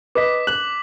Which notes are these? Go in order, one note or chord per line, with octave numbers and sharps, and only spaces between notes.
B4 D#5 D6 B6
F#6 F#7